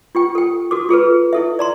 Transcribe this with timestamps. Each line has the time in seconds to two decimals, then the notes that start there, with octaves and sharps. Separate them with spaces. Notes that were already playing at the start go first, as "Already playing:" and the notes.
0.15 F4 G4 G5
0.35 A4 G5
0.71 F#4 A4 D6
0.89 F4 G#4 A4 B4
1.33 E4 A4 E5
1.59 D5 A#5 C6